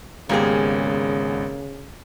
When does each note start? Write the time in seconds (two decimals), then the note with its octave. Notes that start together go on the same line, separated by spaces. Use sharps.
0.29 G#1 C#3 G#3 A#3 B3 G4 G#4